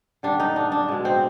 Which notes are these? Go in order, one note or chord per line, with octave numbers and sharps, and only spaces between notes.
D3 G3 D4
D#4
D4
D4
B2 G#3
C4